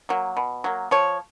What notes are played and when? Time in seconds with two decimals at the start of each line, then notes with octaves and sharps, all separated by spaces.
0.09 F#3 A#3
0.37 B2
0.64 F#3 A#3
0.91 F3 C#5